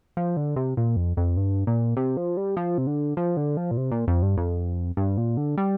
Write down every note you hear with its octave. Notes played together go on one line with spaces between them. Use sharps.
F3
D3
C3
A#2
F2
F2
G2
A#2
C3
F3
G3
F3
C3
D3
F3
D3
F3
A#2
C3
A#2
F2
G2
F2
G2
A#2
D3
G3